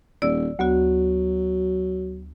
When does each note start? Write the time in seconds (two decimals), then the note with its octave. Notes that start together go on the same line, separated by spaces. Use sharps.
0.22 D#1 D5 E6
0.59 D2 F#3 B3 F#4